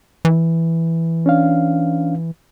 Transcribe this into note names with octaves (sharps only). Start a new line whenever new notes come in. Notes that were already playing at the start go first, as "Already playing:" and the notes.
E3
C#4 D4 F5